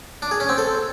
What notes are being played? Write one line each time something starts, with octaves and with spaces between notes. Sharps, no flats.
D4
G#4
C#4
C4
A4